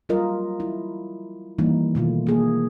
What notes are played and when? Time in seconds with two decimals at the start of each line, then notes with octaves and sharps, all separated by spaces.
0.09 F#3 G3 F4 A#4 D#5
0.60 E4
1.58 D#3 E3 G3 A#3 D#4 E4
1.95 B2 D#3 A3 F4
2.27 A#3 G#4